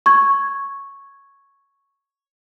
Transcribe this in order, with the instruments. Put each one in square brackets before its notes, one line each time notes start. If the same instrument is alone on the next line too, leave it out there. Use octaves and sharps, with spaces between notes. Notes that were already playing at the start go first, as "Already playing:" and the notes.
[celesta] C#6 G#6